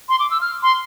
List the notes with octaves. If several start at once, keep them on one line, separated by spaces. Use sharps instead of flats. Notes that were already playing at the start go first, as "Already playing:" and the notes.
C6
D6
E6
F6
C6